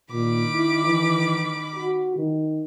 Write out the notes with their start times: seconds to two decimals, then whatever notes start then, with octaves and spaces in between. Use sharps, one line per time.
0.12 A#2 D#3 B5 D6
0.52 E4
0.85 E3
1.76 F#4
2.16 D#3